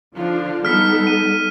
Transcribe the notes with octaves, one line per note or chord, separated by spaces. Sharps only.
D3 F3 D4 F4
G3 B3 D#4 A4 F6 B6
D#7